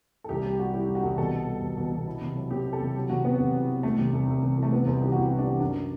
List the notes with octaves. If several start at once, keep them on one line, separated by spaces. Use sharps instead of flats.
A4
C2 G4
G3
G3 F#4
G3 E4
C2
F#4
C2
B2 A4
C2
G3
B2
B2
B2
E4
C3
F#3
C4 G4
E4
A4
C3
F#3
C3 F#4
B3 C4
C3
E4
E4
C2 A3
C3
C2
C2
C3
E3
A3
E3 B3
C2 C4
E3 G4
F#4
C3 E4
C2
D4
E3
F#2 D4